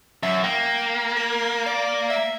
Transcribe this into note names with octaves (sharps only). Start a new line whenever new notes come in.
F#2 E5
A#3 G5
A#4
D5
E5